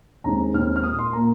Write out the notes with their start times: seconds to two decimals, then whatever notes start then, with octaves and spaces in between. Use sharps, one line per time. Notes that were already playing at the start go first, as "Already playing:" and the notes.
0.24 D#2 D#3 G#3 C4 A#5
0.54 D#2 D#3 G#3 C4 F6
0.76 F6
0.83 A#2 A#3 D#6
0.99 C6
1.13 A#2 A#3 A#5